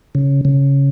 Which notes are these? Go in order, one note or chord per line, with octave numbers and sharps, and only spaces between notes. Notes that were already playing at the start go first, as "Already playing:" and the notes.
C#3
C#3